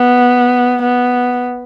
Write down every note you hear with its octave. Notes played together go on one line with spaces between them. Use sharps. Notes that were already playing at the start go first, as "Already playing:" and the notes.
Already playing: B3
B3